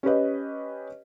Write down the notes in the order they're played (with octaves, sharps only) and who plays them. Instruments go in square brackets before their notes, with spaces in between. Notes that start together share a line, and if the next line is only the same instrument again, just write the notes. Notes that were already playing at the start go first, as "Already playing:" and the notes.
[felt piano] C#4 G4 B4 D#5